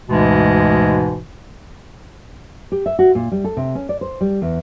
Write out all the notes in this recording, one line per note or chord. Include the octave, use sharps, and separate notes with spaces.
D2 G#2 B2 E3 G#3
G4
E5
F#4
A#2
G3
A4
C3
C#4
D5
C5
G3
E2